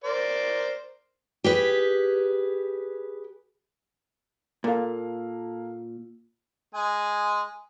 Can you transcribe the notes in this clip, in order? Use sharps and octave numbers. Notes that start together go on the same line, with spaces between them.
A#4 C5 D5
G4 G#4 B4
A#2 A#3 A4 F5
G#3 G#5